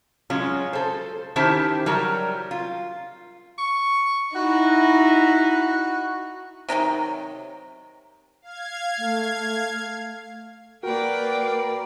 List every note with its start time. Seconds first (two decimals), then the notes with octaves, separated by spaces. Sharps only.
0.30 F#3 G#3 C#4 F4
0.73 A4 C5
1.36 D#3 C#4 E4 G4 C5 A5
1.86 F#3 G3 A#4
2.51 F4
3.58 C#6
4.35 D#4 E4 F#4
6.69 C3 D#3 E3 F#3
8.42 F5 G#6
8.98 A3
10.83 A#3 F#4 A#4 B4 D5 G5